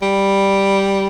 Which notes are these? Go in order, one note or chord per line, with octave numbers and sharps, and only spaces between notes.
G3